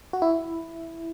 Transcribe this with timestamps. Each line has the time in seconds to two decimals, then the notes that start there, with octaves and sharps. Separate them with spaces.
0.13 F#4
0.22 E4